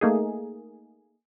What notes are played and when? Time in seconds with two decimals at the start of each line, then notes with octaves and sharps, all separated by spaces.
0.01 A3 A#3 D#4 G#4